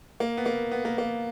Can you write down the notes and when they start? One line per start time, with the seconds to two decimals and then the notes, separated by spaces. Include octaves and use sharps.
0.20 A#3
0.37 B3
0.46 A#3
0.72 B3
0.85 A#3
0.98 A#3